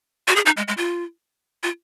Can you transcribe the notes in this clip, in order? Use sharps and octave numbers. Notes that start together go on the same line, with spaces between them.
F#4
G#4
D#4
G#3
G#3
F4
F4